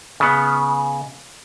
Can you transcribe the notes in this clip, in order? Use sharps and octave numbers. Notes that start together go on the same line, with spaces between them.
C#3 B3